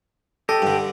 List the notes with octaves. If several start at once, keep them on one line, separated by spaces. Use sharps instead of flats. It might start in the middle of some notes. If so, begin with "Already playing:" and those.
G4 A4 D#5
G2 D3